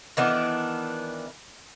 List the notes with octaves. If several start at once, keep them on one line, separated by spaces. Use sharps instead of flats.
D#3 E3 B3 D4